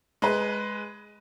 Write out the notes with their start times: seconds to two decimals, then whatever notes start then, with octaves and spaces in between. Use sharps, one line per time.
0.22 G#3 B4